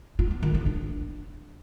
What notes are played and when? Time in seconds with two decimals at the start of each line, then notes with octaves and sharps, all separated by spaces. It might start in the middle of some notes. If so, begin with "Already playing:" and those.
0.19 F4
0.31 B3
0.43 D#3
0.54 B3
0.66 D4